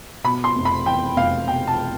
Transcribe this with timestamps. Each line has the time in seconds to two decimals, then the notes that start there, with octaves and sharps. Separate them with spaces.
0.24 B2 B5
0.44 C6
0.55 F1
0.65 B5
0.86 E2 G5
1.16 F1 F5
1.47 B2 G5
1.67 A5